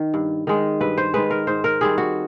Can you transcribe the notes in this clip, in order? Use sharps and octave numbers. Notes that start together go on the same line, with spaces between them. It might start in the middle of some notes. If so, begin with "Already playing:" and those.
Already playing: D#3
G2
D#3 G#3
G2 B4
C5
D#3 G#3 B4
A#4
G#2 C5
A#4
D#3 G3 C4 G#4
F#4